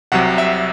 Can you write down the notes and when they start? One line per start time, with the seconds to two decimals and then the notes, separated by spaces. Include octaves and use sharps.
0.12 C2 C3 F#3 F#5
0.38 E5